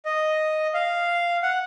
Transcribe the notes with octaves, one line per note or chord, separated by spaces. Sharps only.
D#5
F5
F#5